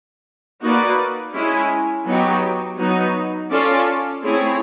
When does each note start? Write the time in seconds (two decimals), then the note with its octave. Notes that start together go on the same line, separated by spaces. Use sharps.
0.61 A#3 D#4 F#4 B4 D5
1.34 G#3 C#4 E4
2.06 F#3 B3 D#4 G4
2.79 F#3 B3 D#4
3.50 C#4 F4 A4 D5
4.23 A3 C4 E4 G#4 C#5